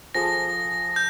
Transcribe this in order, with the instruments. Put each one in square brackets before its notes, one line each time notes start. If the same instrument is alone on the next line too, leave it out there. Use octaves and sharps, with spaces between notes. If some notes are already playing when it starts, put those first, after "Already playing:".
[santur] F3 G#4 A4 [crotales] A#6
[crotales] G6